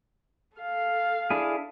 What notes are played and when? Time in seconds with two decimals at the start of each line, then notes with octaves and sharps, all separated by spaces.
0.57 A4 F5
1.30 D4 E4 G#4